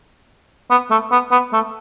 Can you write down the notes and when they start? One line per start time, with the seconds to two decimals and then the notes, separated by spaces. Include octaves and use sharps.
0.70 B3
0.91 A3
1.12 B3
1.31 B3
1.53 A3